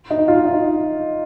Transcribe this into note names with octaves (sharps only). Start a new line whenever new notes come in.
D#4
F4
D#4